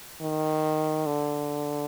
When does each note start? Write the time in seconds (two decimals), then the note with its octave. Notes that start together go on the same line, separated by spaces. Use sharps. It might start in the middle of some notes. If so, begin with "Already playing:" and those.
0.21 D#3
1.06 D3